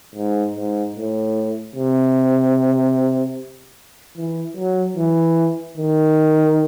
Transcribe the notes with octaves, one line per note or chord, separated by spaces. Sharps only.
G#2
G#2
A2
C3
E3
F#3
E3
D#3